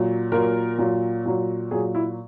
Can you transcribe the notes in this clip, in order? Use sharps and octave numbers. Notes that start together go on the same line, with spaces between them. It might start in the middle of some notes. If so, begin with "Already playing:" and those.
Already playing: A#2 F#3
A#2 F#3 A#4
A#2 F#3
A#2 F#3
A#2 F#3 G#4
E4